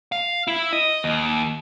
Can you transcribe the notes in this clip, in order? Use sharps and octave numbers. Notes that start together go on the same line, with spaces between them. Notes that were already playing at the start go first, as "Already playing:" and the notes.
F5
E4
D#5
D#2